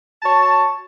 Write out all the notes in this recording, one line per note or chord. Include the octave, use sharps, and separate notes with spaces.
F#4 C#5 A5